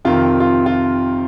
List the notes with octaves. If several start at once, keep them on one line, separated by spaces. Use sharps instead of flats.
F2 C3 D#3 F4
F4
F4